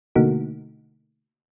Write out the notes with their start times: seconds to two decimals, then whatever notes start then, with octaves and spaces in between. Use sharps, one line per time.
0.16 B2 D3 A3 A#3 D#4 F#4